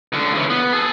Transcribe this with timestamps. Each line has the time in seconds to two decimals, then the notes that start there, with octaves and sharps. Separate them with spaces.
0.13 C#2 D3
0.34 C#3 E3
0.50 B3
0.73 G#4 A4